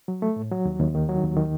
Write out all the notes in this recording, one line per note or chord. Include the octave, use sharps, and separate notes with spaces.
F#3
A3
A2
F#3
D#2
D#2
D#3
F#3
D#2
D#3